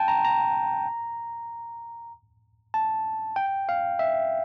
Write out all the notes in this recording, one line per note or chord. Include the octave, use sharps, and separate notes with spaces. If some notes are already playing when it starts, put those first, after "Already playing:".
Already playing: G5 A5
A#5
A#5
A5
G5
F5
E5